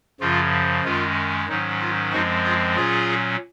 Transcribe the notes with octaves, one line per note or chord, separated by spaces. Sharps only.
F#2 C#3 F3 F4
F#2 D#3 G#3 C#4 F4
G#2 D#3 F#3 C#4 D#4
F4
F#2 F3 G#3 C4 D#4 F#4
F4 G#4
A#2 F#3 C#4 F4 G#4